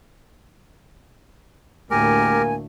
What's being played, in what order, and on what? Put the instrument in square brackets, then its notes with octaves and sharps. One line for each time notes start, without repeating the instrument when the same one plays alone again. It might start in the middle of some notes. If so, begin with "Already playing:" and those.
[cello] D2 A2 [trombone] A#3 [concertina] G4 A#4 [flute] G#5